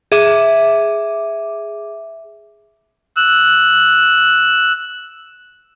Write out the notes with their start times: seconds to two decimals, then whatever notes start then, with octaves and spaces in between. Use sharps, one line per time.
0.12 G#4 E5 D6
3.17 E6 F#6